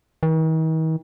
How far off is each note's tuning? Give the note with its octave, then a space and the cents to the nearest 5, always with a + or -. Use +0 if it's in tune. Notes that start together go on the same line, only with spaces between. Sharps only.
D#3 +45